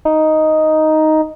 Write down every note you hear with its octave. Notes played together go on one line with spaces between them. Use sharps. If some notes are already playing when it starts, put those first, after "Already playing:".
D#4